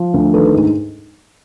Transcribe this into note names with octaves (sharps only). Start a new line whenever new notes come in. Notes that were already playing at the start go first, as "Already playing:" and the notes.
Already playing: F3
D2
D#3 A4 B4
G#2